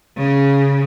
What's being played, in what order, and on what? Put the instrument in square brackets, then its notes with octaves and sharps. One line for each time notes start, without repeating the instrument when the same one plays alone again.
[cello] C#3